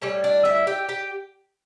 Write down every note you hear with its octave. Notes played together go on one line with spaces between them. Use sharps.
A2 G3 C#4 C#5
D4 D5
E4 E5
G4 G5
G4 G5